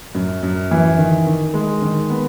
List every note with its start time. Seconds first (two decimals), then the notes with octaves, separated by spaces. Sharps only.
0.15 F#2
0.43 F#2
0.71 E3
0.98 D#3
1.27 D#3
1.54 G#3
1.82 D#3
2.10 B3